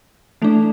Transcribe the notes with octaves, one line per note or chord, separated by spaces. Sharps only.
E3 A3 D4